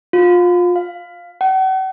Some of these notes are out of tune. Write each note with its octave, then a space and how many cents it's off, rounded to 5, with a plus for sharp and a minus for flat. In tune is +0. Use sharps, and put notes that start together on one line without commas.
F4 +25
F5 +0
F#5 +40